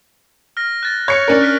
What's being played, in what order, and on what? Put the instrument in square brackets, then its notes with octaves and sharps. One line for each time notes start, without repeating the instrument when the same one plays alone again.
[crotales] F6 A#6
F#6 A6
[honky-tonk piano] C#5 C#7
C#4 D4 A#4
[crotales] F6 F#6 B6